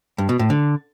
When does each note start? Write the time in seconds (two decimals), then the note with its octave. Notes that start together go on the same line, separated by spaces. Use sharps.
0.18 G2
0.29 B2
0.39 A2
0.50 D3